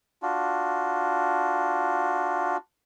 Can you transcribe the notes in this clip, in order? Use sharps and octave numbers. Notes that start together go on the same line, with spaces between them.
D4 F4 F#4